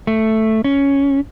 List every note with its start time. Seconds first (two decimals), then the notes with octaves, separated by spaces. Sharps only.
0.07 A3
0.64 C#4